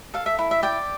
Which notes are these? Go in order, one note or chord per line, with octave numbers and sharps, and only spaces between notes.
A4 F5
E5
E4
E5
D5 G5